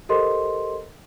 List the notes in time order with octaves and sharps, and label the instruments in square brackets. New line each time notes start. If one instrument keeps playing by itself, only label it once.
[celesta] G4 A4 A#4 C5 D#5 C6